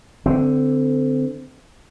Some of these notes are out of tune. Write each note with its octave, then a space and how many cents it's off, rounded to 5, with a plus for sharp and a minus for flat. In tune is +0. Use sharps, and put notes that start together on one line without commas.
D3 +0 C4 -20